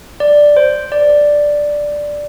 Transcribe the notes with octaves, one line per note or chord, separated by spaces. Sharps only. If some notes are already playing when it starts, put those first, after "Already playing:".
D5
C5
D5